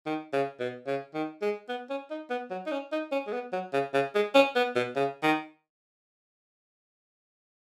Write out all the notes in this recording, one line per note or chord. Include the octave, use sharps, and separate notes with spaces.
D#3
C#3
B2
C#3
D#3
G#3
B3
C#4
D#4
B3
F#3
D#4
C#4
D#4
C#4
G#3
B3
F#3
C#3
C#3
G#3
C#4
B3
B2
C#3
D#3